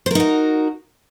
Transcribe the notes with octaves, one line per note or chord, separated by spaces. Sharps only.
D#4 F#4 A#4 C5